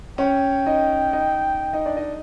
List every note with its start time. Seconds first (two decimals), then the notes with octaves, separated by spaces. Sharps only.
0.18 C#4 C#5 G5
0.66 D#4 D#5
1.13 D#4 D#5
1.73 D#4 D#5
1.86 D4 D5
1.97 D#4 D#5